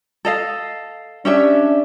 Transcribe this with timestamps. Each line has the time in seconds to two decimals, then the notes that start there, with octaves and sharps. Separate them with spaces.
0.25 A4 D#5 F5
1.25 C#4 D4 G4 E5